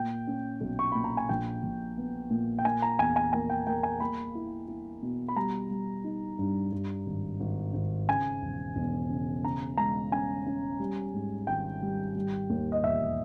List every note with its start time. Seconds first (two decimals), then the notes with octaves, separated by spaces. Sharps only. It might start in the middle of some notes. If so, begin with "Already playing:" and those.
Already playing: A#2 G5
0.27 C#4
0.61 B1
0.79 C#6
0.92 A#2 B5
1.04 A#5
1.17 G#5
1.29 A#1 G5
1.63 A#1
1.98 B3
2.30 A#2
2.59 G5
2.65 A#3 G#5
2.82 A#5
2.99 E2 G#5
3.16 G#5
3.33 A#3 G#5
3.50 G5
3.67 A#3 G5
3.83 G#5
4.00 A#3 B5
4.35 E4
4.68 E4
5.02 B2
5.28 B5
5.36 G3 A#5
5.71 G3
6.04 D#4
6.39 G2
6.72 G2
7.06 G#1
7.40 G#1
7.74 G#1
8.08 C#3 G#5
8.42 E1
8.76 E1
9.10 C#3
9.44 C#3 A#5
9.77 G#3 A#5
10.12 C#4 G#5
10.46 C#4
10.79 G3
11.14 G#2
11.47 G#1 G5
11.82 G3
12.16 G3
12.50 D#2
12.72 D#5
12.83 E1 E5